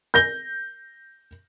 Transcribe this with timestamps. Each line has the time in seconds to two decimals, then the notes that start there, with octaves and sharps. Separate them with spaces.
0.14 G6 A#6 G7